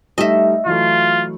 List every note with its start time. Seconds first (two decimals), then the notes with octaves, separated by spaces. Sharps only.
0.18 G3 A3 D#4 D#5 E5
0.66 E3 F#3 A3 F4